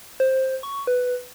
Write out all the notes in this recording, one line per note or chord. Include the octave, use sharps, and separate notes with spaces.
C5
C#6
B4